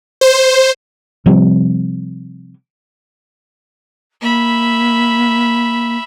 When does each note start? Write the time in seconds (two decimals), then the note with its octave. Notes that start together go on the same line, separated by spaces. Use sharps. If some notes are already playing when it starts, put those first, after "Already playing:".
0.21 C5
1.26 C3 F3 G3 C4
4.21 A#3 E5 B5